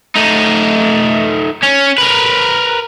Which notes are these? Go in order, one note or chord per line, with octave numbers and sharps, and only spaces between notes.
A3 D#4
C#4
A#4 B4